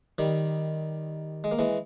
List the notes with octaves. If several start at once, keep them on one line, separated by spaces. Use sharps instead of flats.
D#3 G3
G#3
A#3
E3 G#3